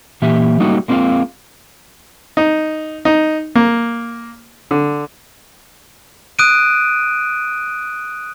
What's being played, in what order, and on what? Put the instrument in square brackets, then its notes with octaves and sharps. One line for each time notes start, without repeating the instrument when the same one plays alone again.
[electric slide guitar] A#2 E3 A#3 G4 E5
F#3 G3 A3 A#3 D#4 F#4
G#3 A#3 C4 E4 F4 F5
[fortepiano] D#4
D#4
A#3
D3
[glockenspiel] D#6 F#6 D7 D#7